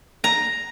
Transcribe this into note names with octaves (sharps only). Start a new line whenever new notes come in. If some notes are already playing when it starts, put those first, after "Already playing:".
A#5